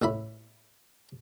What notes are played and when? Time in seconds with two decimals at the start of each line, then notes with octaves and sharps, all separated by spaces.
0.02 A1 A2 E4 B5